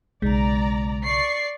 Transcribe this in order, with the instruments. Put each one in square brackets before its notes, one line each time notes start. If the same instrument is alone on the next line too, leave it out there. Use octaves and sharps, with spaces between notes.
[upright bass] B1 C#3 [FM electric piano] G#3 [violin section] D5 A#5
[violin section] D5 C#6 C7